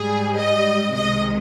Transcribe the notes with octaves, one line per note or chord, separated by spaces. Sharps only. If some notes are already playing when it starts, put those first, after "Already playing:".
Already playing: G#2 G3 G#4
D#5
C2 C3 D#3 G#3 D#5